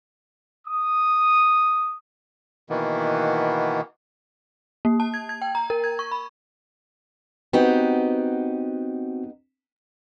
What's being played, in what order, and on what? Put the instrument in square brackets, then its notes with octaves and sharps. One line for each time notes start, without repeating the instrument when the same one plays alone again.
[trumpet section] D#6
[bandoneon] B2 D#3 E3 A#3 B3
[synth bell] A#3
A5
G#6
G#6
G5
A#5
A#4
G#6
C#6
B5
[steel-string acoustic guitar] B3 D#4 G4 [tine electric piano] C4 F#4